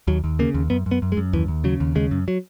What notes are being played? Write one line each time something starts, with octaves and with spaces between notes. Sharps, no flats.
D#2 F#3
D#2
C#3 A#3
D#2
F#2 B3
F#2
B3
F#2
G#3
F#2
D#2 E3
D#2
C#3 F#3
D#2
C#3 G#3
F#2
F#3